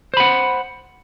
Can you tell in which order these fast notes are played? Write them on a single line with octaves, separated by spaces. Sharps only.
C5 B5 F#5